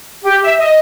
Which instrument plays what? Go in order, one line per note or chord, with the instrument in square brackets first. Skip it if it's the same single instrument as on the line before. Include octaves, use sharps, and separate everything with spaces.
[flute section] G4
E5
D#5